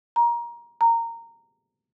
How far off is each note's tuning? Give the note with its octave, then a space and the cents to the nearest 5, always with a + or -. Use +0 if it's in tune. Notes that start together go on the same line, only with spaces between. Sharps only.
A#5 +20
A#5 -15